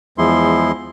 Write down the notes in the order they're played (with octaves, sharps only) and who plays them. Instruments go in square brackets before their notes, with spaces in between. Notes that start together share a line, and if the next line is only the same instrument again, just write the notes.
[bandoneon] E2 F3 G#3 E4 C6